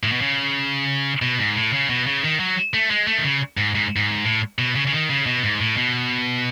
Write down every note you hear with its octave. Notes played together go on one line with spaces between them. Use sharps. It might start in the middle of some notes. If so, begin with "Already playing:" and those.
A2
B2
C#3
B2
G#2
A2
C#3
B2
C#3
D#3
F#3
A3
G#3
A3
D#3
C#3
G#2
G#2
G#2
A2
B2
C#3
C#3
D#3
C#3
B2
G#2
A2
B2